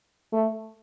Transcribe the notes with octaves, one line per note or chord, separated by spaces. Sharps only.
A3